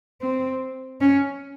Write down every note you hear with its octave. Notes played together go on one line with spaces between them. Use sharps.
C4
C#4